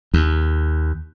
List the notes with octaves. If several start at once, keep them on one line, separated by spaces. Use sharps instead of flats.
D#2